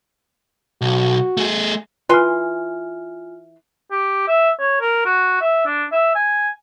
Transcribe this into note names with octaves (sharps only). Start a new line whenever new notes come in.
B1 F#4
A3 G#4
E3 F4 B4 G#5 C6 F6
G4
E5
C#5
A#4
F#4
E5
D4
E5
G#5